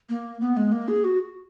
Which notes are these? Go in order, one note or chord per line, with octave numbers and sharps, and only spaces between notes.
A#3
B3
G#3
A#3
G#4
F#4